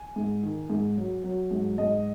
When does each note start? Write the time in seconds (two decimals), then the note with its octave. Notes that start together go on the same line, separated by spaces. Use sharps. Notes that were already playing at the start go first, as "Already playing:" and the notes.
Already playing: G#5
0.16 G#2
0.43 D#3
0.70 G#2
0.97 F#3
1.24 F#3
1.51 G#2
1.78 G#2 D#5